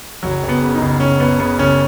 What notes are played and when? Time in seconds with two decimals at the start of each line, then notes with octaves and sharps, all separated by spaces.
0.23 F#1 F#3
0.43 F#1
0.49 B3
0.62 C#3
0.75 D#4
0.81 F#1
1.00 F#1 C#4
1.19 F#1 B3
1.39 C#3 B3
1.58 F#1 C#4